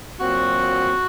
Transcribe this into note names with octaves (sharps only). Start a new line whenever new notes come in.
A#2 F#3 C4 F#4